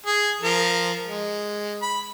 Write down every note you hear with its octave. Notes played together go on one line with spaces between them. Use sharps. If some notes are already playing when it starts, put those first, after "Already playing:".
G#4
F3 A#4
G#3
B5